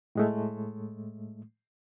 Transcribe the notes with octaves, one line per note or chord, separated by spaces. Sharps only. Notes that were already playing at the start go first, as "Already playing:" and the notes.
A2 G#3 A3